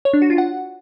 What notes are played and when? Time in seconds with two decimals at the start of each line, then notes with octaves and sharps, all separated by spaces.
0.05 C#5
0.13 D4
0.22 F#4
0.30 F4
0.38 F#5